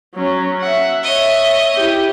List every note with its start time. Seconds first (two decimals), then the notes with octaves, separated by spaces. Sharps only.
0.14 F#3 C#4
0.61 E5 F#5
1.04 C#5 D#5 E5
1.75 E4 G4